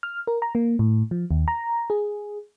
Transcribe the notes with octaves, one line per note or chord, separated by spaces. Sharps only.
F6
A#4
A#5
A#3
A2
F3
D#2
A#5
G#4